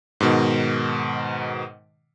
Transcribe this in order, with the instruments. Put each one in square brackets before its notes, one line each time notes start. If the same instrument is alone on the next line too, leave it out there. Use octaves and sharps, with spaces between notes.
[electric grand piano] G#2 B2 D#3